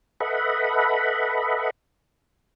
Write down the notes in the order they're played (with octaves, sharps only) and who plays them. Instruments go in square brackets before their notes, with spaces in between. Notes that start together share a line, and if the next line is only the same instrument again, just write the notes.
[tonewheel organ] A4 B4 D#5 E5 F#5 B5